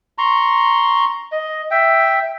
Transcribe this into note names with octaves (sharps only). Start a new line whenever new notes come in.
A#5 C6 C#6
D#5
E5 G5